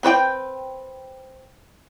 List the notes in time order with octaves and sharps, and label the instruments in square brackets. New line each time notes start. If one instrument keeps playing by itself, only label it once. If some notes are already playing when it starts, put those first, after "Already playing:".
[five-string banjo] C4 B4 C#5 G5